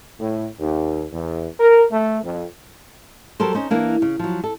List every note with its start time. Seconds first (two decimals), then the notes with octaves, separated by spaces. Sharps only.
0.20 A2
0.58 D#2
1.12 E2
1.59 A#4
1.91 A3
2.23 F2
3.40 F#3 G3 A4 A#4 C5
3.55 C#4 D#4 C5
3.71 E3 A#3 D4
4.02 C#3
4.19 F3 F#3
4.44 A4